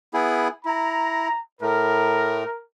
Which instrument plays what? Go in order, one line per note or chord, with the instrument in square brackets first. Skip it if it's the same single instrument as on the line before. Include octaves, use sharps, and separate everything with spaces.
[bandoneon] B3 E4 G#4
[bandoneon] E4 [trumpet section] A#5
[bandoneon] A2 A3 [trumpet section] A#4